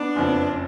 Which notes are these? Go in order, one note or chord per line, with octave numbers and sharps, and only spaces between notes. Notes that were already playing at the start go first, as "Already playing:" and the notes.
Already playing: B3 D4
F#1 F2 F3
C#4